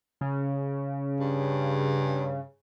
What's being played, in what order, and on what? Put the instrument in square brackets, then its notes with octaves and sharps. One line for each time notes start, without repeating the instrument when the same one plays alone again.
[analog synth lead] C#3
[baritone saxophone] G2